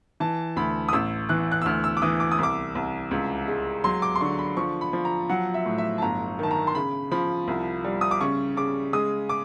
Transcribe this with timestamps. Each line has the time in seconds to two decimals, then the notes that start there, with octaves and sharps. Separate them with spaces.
0.20 E3 A5
0.56 D2 B5
0.89 D#6
0.93 A1 E6
1.29 E3 F#6
1.52 F#6
1.62 E6
1.66 D2 F6
1.84 E6
1.97 D6
2.02 E3 D#6
2.20 D6
2.32 D#6
2.39 C2 D6
2.75 C2
3.11 C#2
3.48 G#3
3.84 F#3 C6
4.02 D6
4.16 C6
4.21 D3 C#6
4.39 B5
4.57 F3 C#6
4.81 B5
4.93 F3
5.05 A#5
5.29 F#3 F#5
5.54 E5
5.66 A2
5.78 E5
5.98 A5
6.02 G1 A#5
6.39 D#3 A5
6.51 A#5
6.67 C6
6.75 C#3 B5
7.11 F3 B5
7.48 C2
7.84 G3
8.01 D#6
8.11 D6
8.21 C#3 C#6
8.57 C#3 D6
8.93 G#3 D#6
9.29 D6